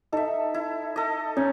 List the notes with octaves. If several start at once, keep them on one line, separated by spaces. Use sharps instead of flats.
D#4 A4 E5
E4
A4 D#5
C#4 D#4